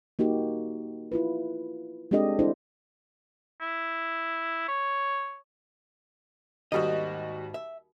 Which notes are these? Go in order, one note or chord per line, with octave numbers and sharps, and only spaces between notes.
A#3 D#4 F#4 G4
E4 F4 B4
G#3 C4 D4 G4 A4 D#5
D4 E4 A4 C5
E4
C#5
D#2 G#2 B2 G3 F#4 D#5
E5